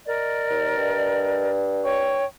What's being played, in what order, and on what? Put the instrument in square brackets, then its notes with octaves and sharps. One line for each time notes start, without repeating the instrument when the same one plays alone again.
[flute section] A#4 D5 D#5
[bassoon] D#2
G2
[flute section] C#5 G5 C#6